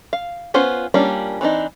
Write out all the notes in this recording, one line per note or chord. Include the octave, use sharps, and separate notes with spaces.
F5
B3 C#4 F4 C5
G3 A#3 C#4 D4 F4
E3 C4 D4 D#4